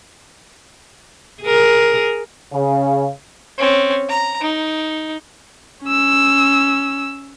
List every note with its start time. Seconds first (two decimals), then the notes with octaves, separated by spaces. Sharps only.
1.42 G#4 A#4
2.53 C#3
3.58 C4 C#4
4.09 A#5
4.41 D#4
5.85 C#4 E6